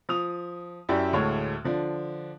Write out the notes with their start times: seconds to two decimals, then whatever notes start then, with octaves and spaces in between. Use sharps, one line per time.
0.09 F3 D#6 F7
0.89 F#2 E4 G4 D5
1.13 D2 A2 G#3 C#5
1.64 D3 F3 D4